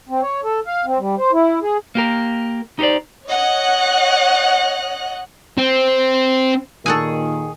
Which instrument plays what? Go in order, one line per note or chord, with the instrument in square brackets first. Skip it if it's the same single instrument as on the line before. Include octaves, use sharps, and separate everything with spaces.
[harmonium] C4
C#5
A4
F5
C4
G3
C5
E4
G#4
[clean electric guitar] A#3 G4 A#4
D#4 G4 A4 C5 D5
[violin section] C#5 D#5 F#5 F#6
[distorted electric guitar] C4
[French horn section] A#2 D#3 [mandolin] G#4 C#6 [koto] A4 F#5 G#5